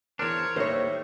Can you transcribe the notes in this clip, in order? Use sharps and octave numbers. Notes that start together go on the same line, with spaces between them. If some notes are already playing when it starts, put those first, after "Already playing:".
E2 D4 A#4 C5 C#5
D#2 A2 G3 C5 C#5